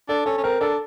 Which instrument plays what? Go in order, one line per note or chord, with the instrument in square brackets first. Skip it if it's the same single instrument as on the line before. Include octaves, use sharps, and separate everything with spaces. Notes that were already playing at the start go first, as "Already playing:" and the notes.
[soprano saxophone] D4 [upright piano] A4
[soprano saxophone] C#4 [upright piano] A4
[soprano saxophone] C#4
[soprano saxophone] C4 [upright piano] A#4
[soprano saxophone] D4 [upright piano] A4